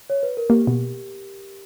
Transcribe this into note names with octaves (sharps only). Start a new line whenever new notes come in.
C#5
B4
A#4
A#3 G4
B2